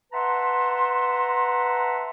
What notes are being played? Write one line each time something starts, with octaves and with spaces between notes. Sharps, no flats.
B4 E5 F#5 A5 A#5 C6